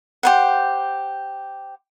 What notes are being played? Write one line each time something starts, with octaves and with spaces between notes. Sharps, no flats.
G4 C5 F#5